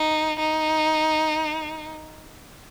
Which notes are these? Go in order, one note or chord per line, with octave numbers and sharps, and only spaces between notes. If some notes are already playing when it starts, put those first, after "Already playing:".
Already playing: D#4
D#4